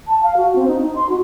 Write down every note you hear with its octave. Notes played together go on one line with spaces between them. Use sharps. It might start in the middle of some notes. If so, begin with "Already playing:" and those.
A5
F5
F#4
C4
D#4
D#4
C6
F#4